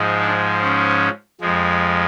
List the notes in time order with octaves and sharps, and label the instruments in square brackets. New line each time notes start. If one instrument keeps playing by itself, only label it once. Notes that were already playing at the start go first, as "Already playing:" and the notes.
Already playing: [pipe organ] G#2 F3 G#3
D4
C#4
F2 F3 G#3